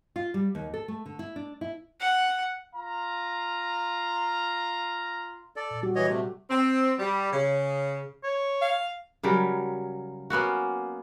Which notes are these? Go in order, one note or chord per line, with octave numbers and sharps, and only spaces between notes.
F4
G3
D#2
A4
A3
D3
E4
D4
E4
F#5
F4 F5 A#5
A4 D5
A#2
G3 F#4 G4
E3 C#5 D#5
C3 A3
C4
G3
C#3
C#5
F5
C#3 F#3 G3 A#4
A#3 B3 C#4 F#4